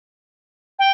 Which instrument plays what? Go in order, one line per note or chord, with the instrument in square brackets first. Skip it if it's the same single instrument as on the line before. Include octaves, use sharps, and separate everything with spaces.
[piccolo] G5